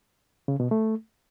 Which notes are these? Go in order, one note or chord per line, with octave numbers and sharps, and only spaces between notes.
C#3
B2
A3